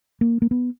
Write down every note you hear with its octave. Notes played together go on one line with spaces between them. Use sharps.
A#3
A#3
B3